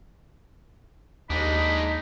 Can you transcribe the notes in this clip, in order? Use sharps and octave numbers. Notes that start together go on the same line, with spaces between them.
D#2 G#3 D4 D#4 B5